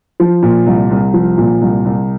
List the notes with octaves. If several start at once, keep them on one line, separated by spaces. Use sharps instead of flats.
F3
A#2
C2
C2
F3
A#2
C2
C2